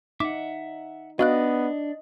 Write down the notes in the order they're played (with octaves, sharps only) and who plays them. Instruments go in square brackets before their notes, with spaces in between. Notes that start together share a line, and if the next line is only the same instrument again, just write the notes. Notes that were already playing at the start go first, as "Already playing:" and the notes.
[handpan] D#4 [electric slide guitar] E5 F#5 [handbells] D6
[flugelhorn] B3 [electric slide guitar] D4 [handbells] F#4 F5 F#6 [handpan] D#5